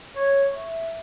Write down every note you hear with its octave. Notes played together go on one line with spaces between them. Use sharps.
C#5
E5